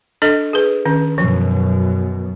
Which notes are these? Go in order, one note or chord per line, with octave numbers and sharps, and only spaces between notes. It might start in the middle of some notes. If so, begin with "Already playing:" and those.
D4 A4 D#5
G#4 B4
D#3 C#4
F#2 B2 F3